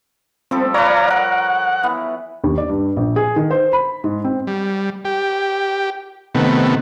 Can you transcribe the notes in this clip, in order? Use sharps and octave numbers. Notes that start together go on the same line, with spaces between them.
F3 G3 C4 A4
B4 C#5 D5 F5 A#5
A#4 F#5
E3 B3
D#2
D5
G2
A#1
G#4
D#3
C5
B5
G#2
C4
G3
G4
C3 D#3 A3 B3